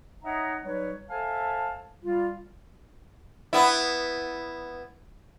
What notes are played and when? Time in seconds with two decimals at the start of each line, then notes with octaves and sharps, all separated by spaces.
0.24 D#4 C#5 D#5 E5 F#5 A#5
0.64 F#3 G3 D#4 B4 C#5
1.09 A4 C5 E5 F5 G#5 A5
2.03 G3 F4
3.53 B3 E4